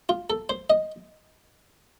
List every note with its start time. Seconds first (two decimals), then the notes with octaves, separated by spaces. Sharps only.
0.09 F4
0.30 A4
0.49 C5
0.70 D#5